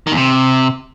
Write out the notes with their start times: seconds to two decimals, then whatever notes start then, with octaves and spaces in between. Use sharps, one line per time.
0.07 D#3
0.12 E2
0.17 C3